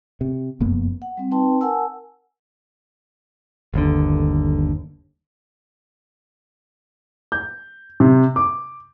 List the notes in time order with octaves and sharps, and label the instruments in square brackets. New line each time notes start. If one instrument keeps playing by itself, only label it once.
[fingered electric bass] C3
F1 F#2 A#3 B3
[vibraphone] F#5
G3 C4
C4 D#4 B4 G5 A5 C6
A#4 F#5 G#5 A5 E6
[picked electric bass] G1 D#2 D3
[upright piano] G6
C3
D6